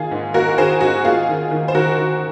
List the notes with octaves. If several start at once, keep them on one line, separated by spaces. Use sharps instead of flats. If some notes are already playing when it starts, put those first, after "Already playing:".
Already playing: D#3 A#3 F4 G#4
G#2
A#3 F#4 A#4
D#3 G#4 C5
G#2 F#4
A#3 F4 G#4
D#3
D#3
C5
D#3 F#4 A#4
D#3